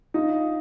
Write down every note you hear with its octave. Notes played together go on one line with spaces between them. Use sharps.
D#4 F4